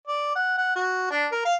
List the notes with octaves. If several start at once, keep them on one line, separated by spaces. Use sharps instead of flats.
D5
F#5
F#5
F#4
D4
A#4
F5